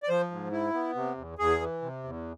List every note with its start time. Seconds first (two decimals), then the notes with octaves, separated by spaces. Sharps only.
0.03 D5
0.09 F3 C5
0.31 G#2
0.52 E4
0.74 B3
0.95 C3
1.17 E2
1.39 E2 G#4
1.60 E3
1.82 C3
2.04 E2